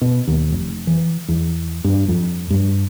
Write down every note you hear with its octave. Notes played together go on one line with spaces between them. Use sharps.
B2
D#2
F1
E3
E2
G2
F2
G2